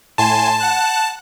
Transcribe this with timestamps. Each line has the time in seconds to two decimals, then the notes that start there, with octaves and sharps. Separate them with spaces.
0.18 A2 G#5 A5 C6
0.60 F#5 F#6